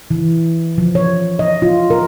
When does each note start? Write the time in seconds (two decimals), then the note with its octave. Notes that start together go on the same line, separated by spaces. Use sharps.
0.11 E3
0.78 F3
0.95 C#5
1.39 D#5
1.62 F4
1.90 A#4